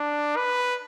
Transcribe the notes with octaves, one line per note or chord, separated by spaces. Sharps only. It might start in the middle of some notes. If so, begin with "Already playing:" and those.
Already playing: D4
B4